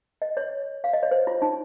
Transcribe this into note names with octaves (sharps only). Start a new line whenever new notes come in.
D#5
C#5
F5
D#5
C#5
C5
F4
D#4